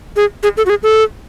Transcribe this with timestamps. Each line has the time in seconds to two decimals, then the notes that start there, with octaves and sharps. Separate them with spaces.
0.16 G#4
0.43 G#4
0.57 A4
0.66 F#4
0.70 G#4
0.83 A4